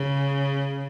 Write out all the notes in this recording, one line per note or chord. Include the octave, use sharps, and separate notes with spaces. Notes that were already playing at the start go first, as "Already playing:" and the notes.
Already playing: C#3